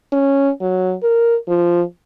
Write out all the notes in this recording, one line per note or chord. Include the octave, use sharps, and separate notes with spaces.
C#4
F#3
A#4
F3